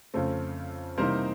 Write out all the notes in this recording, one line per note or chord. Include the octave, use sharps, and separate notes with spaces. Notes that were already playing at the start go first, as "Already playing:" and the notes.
F2 C#3 F3 A3 C4
C3 E3 G3 A#3 D#4 A#4 C5